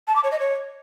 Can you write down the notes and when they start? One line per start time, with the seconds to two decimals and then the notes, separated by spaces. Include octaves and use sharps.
0.07 A5
0.15 D6
0.23 C#5
0.31 D#5
0.39 C#5